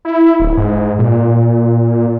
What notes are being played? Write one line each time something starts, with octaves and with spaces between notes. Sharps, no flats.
E4
D1
G#2
A#2